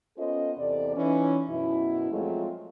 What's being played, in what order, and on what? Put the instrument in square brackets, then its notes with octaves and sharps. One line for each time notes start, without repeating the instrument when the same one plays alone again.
[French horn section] B3 C#4 F4 A4 C5 D#5
E2 C3 A4 D5
E3 C#4 D#4
F#2 B2 E4
F3 F#3 G#3 A3 C4 F4